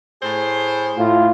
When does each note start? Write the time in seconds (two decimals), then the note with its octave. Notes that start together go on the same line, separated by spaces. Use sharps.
0.22 A2 G#4 C5
0.98 A2 F4